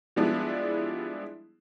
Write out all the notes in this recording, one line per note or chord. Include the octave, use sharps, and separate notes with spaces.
F3 G3 G#3 B3 D4 E4